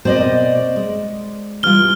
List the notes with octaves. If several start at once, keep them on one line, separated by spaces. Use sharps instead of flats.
B2 A#3 C4 C5 D5 D#5
G#3
E3 G3 F4 F6 G7